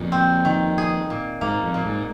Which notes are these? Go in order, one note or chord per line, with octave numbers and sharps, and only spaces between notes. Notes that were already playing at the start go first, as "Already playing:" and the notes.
Already playing: F2 A#2
C4
D#3
G#4
A#2
G#2 A#3
F2
A#2
G#2